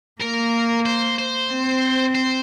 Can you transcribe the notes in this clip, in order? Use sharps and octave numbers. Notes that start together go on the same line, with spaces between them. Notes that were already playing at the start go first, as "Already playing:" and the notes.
A#3 A#4
C5
C5
C4
C5